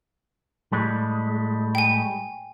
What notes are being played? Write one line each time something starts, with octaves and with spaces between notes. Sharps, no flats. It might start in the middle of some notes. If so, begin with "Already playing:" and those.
A2 G3 G#3
G5 G#5